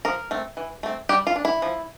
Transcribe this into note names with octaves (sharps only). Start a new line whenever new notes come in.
F3 A#4
A3 C4
E3
A3 C4
G3 G4
F4
D4
E4
F3